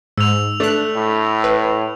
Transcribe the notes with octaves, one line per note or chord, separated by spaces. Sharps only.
G#2 E6 F7
A3 D4 F#6
A2
B4